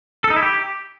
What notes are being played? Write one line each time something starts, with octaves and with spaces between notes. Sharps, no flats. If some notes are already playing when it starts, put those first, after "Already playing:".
A4
D#4
E4
G4